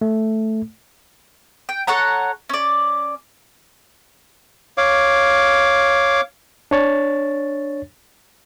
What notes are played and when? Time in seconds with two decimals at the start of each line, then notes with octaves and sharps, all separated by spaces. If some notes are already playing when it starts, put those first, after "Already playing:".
0.01 A3
1.69 G5
1.87 A4 C#5 F#5 A#5
2.49 C#4 D5
4.78 C#5 F5 D6
6.71 D4 C#5 A6